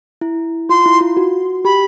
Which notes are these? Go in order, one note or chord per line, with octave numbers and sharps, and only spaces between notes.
E4
F4 C6
E4
F4
F#4
G4 B5